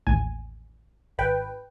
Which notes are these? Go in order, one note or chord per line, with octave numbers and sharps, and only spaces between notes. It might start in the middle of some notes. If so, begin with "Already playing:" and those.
A1 D#2 G#5
G#1 B4 G5